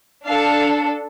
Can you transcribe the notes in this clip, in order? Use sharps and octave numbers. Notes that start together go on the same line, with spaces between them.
D4 A4 F5